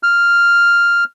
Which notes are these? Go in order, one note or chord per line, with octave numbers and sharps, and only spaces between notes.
F6